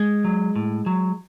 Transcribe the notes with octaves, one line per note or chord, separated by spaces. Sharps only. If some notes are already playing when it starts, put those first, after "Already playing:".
Already playing: G#3
F#3
A2
F#3